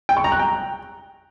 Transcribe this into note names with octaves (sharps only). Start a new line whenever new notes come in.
G5
C#6
A#5
F#6
G5